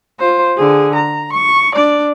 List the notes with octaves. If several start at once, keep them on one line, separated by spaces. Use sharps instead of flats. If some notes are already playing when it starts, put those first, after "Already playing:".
F4 C5
D3 G#4
A#5
C#6
D4 D5